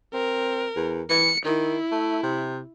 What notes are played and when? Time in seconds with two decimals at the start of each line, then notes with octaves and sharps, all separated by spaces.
0.13 C4 A#4
0.76 E2
1.10 E3 C#7
1.45 D#3 E4
1.92 A3
2.23 C3